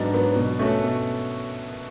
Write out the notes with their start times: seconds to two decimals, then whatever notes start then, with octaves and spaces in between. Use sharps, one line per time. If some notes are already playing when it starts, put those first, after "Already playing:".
Already playing: G#2 F#3 B3 D4
0.13 F#3 B3 D4
0.36 B2
0.59 A3 C#4 F#4 A4
0.84 B2